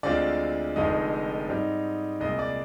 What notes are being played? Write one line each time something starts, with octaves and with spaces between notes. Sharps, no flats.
D2 D3 G#3 C4 F4 D5
F1 F2 D3 G#3 D#4 D#5
G#2 G3 C4
C2 A#2 G#3 D#5
D5